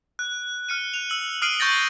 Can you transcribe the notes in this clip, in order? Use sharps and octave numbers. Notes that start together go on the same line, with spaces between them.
F#6
F6 C#7 D#7
F#6 F7
E6 F#7
D#6 F6 C7 D7 D#7 F#7
C#6 G6 A6 A#6 F#7